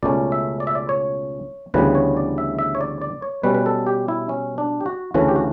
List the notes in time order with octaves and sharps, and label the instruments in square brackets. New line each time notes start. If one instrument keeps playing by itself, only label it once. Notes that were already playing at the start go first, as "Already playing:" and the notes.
[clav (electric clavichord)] C#2 B2 A3 C#4 D5
E5
D5
E5
D5
C#5
D2 C#3 E3 G3 B3 B4
C#5
D5
E5
E5
C#5
D5
D5
C#5
B2 G3 C#4 B4
B4
A4
G4
E4
C#4
D4
G4
F#4
D2 C#3 E3 A3 C#4 F#4
G4
F#4